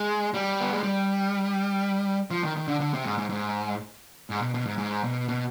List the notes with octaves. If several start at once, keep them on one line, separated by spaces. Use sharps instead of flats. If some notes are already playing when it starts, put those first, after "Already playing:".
Already playing: G#3
G3
B3
G#3
G3
F3
D#3
D#3
D3
D3
C3
G#2
G#2
G#2
G#2
B2
B2
G#2
G#2
B2
B2